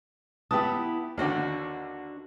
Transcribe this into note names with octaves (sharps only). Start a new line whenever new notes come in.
B3 E4 G4 B4 A5 D#6
D#2 D3 D4 F#4 C5